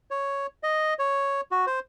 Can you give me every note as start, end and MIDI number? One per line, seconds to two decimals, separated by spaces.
0.11 0.47 73
0.63 0.94 75
0.99 1.41 73
1.51 1.66 66
1.67 1.80 72